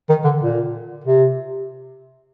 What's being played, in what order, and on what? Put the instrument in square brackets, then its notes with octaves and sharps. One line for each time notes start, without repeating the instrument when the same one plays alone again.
[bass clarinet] D#3
D3
A#2
C3